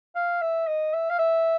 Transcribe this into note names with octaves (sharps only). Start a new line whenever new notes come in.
F5
E5
D#5
E5
F5
E5